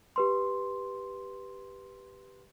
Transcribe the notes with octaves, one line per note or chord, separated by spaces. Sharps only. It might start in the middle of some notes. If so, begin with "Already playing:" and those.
G4 B4 C6